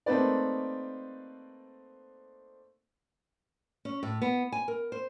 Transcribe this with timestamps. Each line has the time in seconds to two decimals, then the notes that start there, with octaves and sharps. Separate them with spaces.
0.06 A3 A#3 C4 D#4 B4 D5
3.85 C#4
4.03 A2
4.22 B3
4.52 G#5
4.68 A#4
4.92 C5